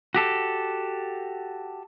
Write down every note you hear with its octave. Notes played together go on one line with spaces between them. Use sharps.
F#4 G4 A4